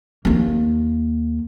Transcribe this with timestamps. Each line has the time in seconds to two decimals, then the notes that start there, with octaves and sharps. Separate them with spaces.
0.25 D#2 A#3